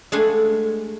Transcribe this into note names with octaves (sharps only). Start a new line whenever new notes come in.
G#3 A3 D4 F5 F#5 G#5